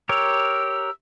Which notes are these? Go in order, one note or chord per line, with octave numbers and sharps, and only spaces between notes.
G4 A#4 C#5 E6